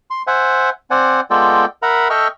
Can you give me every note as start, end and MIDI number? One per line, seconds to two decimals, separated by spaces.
0.10 0.22 84
0.27 0.70 72
0.27 0.70 76
0.27 0.70 78
0.27 0.70 80
0.91 1.21 60
0.91 1.21 72
0.91 1.21 74
0.91 1.21 78
0.91 1.21 80
1.31 1.65 56
1.31 1.65 59
1.31 1.65 65
1.31 1.65 69
1.31 1.65 74
1.31 1.65 79
1.82 2.08 70
1.82 2.08 76
1.82 2.08 78
1.82 2.08 82
1.82 2.08 83
2.10 2.28 69
2.10 2.28 75
2.10 2.28 76
2.10 2.28 79
2.10 2.28 85
2.10 2.28 89